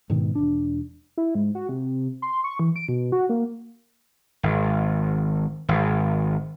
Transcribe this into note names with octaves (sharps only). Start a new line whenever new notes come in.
G#2 B2 D#3
E1 D4
E4
G#2
F#4
C3
C6
C#6
E3
D7
B2
F#4
A#3
G#1
G#1